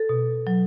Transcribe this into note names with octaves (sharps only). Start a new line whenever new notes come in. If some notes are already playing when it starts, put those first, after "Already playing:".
Already playing: A4
B2
F#3